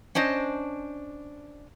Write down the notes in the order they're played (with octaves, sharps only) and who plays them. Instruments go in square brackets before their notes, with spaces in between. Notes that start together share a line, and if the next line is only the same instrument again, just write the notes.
[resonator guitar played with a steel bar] C#4 D4 C5 D#5